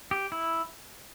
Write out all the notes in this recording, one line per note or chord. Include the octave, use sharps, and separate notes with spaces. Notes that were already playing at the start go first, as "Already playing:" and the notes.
G4
E4